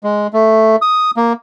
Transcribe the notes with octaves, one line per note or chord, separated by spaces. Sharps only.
G#3
A3
D#6
A#3